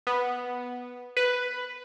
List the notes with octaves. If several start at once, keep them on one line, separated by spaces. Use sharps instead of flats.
B3
B4